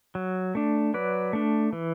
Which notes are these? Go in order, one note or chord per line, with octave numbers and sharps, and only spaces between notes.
F#3
A3 D4
F#3 B4 D5
A3 D4
E3